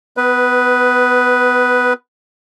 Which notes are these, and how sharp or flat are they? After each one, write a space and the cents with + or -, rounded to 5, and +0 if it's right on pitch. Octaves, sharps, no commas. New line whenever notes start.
B3 +25 B4 +0